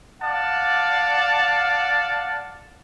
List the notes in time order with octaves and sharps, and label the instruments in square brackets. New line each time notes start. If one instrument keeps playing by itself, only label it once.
[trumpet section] D5 F5 F#5 A5